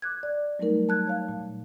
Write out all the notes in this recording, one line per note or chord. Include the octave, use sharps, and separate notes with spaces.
D6 F#6 G#6
D5
F#3 G3 A3 D#4 A#4
A5 F#6 G#6
C#5 F5 A5
A#2